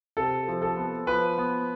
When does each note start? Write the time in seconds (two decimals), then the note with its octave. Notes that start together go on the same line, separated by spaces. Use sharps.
0.17 C3 A4
0.48 F3
0.62 A4
0.77 B3
1.07 F3 B4
1.38 B3